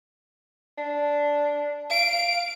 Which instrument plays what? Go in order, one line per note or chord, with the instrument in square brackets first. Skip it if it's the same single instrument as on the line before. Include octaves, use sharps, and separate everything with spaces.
[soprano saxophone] D4
[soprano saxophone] F5 [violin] D7